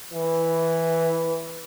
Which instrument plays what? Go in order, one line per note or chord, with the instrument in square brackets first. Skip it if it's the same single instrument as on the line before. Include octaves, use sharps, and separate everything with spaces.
[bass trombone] E3 [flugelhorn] B4